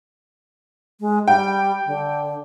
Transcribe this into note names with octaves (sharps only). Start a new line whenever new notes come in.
G#3
G3 G5
D3